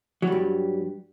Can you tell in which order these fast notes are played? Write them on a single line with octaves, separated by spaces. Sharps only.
F#3 G3 G2